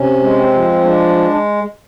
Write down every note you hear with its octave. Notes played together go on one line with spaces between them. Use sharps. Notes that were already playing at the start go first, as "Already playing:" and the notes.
Already playing: C3 C#4
G#3
C4
F3
G#3 D4